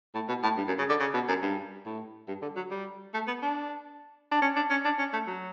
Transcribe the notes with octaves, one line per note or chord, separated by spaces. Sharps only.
A2
B2
A2
G2
F#2
C#3
D3
C#3
B2
F#2
G2
A2
G2
D3
F#3
G3
A3
B3
D4
D4
C#4
D4
C#4
D4
C#4
A3
F#3